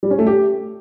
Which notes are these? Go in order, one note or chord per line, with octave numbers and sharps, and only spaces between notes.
G3
C#4
A3
G4